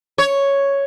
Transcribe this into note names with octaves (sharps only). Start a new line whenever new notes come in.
C#5